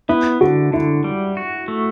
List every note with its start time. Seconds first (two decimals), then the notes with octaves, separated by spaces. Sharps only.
0.09 B3 E4
0.41 D3 F#4
0.73 D3 E4
1.04 G3
1.37 F#4
1.68 A3